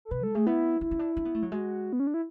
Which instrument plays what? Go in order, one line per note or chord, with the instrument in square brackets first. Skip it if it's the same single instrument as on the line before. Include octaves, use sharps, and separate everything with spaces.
[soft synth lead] A4
[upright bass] B2 [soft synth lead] B4
[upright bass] G#3 [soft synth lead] A4
[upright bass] A3 [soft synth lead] G#4
[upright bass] B3 [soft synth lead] E4
[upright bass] D4 [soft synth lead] E4
[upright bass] C#4
D4
D4
B3
A3
F#3
[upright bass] G#3 [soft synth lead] F#4
[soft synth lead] B3
C#4
D4
E4